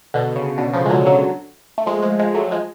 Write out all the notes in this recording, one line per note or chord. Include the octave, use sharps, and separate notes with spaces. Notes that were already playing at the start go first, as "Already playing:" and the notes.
B2 D3
C#3
B2 D3
C#3 F3
G#3
D3 F#3
D3 F#3
A3
F3 G#3
F3 G#3
F3 G#3
F#3 A3
F3 G#3